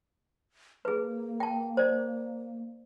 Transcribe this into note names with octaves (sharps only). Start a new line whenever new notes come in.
A#3 G#4 B4
G5 A5
C5 D5